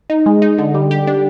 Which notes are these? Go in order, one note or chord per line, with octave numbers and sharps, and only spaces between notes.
D#4
G#3
D#4
D3
G3
G4
D4